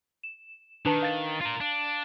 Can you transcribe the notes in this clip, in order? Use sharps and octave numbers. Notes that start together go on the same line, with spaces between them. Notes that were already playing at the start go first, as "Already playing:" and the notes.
E7
D#3 D4 B4 A5
F5 A6
F4 A#4
D4